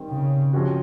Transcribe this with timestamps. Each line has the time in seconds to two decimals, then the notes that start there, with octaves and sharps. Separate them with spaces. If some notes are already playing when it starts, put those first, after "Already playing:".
Already playing: D#3 G3 C4
0.10 C#3
0.53 C3 F3 G#3 C#4 F#4